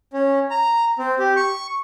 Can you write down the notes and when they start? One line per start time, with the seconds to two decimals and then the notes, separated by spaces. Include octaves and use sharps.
0.13 C#4
0.51 A#5
0.99 C4
1.19 G4
1.36 C#6